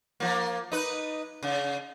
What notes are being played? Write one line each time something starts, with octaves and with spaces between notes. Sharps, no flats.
F3 A#3
D#4 B4
C#3